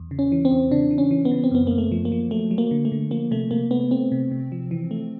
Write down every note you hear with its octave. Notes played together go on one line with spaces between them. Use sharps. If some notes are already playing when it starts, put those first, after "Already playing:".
Already playing: E2
C#3
C#4
E3
C4
E2
C#3 D4
E3
C#4
E3
B3
C#3
C4
F#2 B3
F#2 A#3
A3
F3
A#3
F3
F#3 A3
F#3
A#3
D3
A3
D3
F3 A#3
C3 A3
C3 A#3
A3 B3
A3 C4
C3
C3
F3
E3
A3